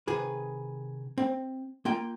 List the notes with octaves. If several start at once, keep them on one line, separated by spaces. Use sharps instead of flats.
C3 D#3 G#4 B4
C4
A#3 F4 G5